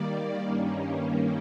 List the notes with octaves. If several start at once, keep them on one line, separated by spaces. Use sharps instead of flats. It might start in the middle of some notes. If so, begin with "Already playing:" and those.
Already playing: D#3 G3 A#3 D5
G2 D#3 G3 A#3 C#4